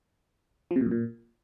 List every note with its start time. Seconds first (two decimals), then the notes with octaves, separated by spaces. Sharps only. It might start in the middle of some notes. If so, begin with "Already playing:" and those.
0.71 F3
0.76 C3
0.81 A#2
0.86 F#2
0.91 A#2